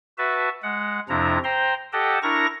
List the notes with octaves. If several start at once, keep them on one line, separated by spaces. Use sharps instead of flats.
F#4 B4 E5 A5
G#3 F#5
F2 C3 F3 D4 E4 A#5
C5 G5 A#5 C6
G4 A4 D#5 F#5 G5 A5
D4 E4 A#4 A#5 C#6 A#6